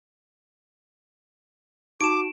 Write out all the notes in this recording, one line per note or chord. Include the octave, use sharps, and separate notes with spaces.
D#4 F#4 G4 A5 D6 D7 E7